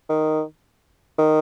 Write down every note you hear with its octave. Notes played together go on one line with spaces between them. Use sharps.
D#3
D#3